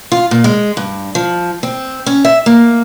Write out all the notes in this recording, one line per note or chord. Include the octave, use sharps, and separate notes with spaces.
F4
A#2
G#3
G2
F3
C4
C#4
E5
A#3